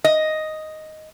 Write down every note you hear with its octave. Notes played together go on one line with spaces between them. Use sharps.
D#5